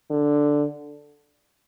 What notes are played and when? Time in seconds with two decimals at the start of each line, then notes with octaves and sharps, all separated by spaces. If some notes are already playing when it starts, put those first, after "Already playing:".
0.10 D3